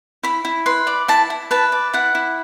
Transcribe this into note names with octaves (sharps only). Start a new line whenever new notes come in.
E4 B5
E4
B4 C6
D5
E4 A5
E4
B4 A5
D5
E4 F#5
E4